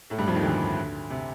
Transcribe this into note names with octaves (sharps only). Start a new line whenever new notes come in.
A2 A3
G2 G3
F2 F3
D#2 D#3
D2 D3
C3